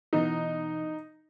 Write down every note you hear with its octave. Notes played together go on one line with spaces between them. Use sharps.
B2 E3 B3 D#4